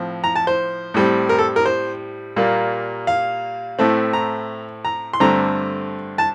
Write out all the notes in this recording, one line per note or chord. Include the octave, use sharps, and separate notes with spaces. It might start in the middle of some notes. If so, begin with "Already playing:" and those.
Already playing: A2 F3 C4
A#5
A5
C5
A2 G3 C4
A#4
A4
A#4
C5
A#2 G3 A#3
F5
A2 A3 C4
A#5
A#5
C6
G2 D3 A3 C4 A#5
A5